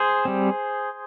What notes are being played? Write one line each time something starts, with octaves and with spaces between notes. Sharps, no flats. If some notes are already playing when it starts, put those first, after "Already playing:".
Already playing: G#4 C5
G3 C4